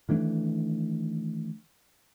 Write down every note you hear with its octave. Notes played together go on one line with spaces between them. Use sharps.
D#3 E3 A3 D4